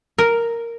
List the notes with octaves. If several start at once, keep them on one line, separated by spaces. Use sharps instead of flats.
A#4